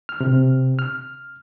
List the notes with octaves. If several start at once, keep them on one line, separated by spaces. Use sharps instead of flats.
F6
C3
F6